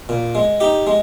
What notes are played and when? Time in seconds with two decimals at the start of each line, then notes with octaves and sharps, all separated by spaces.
0.09 A#2
0.35 G#3
0.60 D#4 G4
0.87 G#3